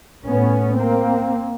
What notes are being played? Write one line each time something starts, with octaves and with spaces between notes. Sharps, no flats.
A2 B3 C#4
A#3 C4